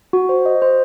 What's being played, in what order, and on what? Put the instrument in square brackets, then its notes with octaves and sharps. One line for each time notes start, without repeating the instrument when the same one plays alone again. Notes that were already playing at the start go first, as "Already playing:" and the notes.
[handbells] F#4
C5
D#5
C5